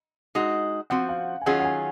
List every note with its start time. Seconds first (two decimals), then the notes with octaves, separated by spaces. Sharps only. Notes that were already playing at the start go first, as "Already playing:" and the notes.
0.35 G#3 D#4 F#4
0.90 F3 C4 F#4 F#5
1.09 F5
1.42 G#5
1.46 D#3 F#3 C#4 F4 G#4 F#5
1.60 F#5
1.65 G#5